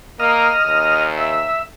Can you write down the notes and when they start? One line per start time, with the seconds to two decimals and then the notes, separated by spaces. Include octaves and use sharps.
0.20 A#3 D#5 F6
0.65 D#2
1.17 E5